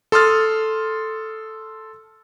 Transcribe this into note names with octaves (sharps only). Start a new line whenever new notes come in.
A4 C6 D#6 F6 A6